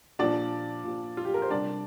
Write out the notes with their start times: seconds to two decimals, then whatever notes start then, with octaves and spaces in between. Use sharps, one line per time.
0.19 A#2 F3 D4 D5
0.84 A#2 F3
1.17 F4
1.25 G4
1.34 A#4
1.42 C5
1.50 C3 G3 D4 D5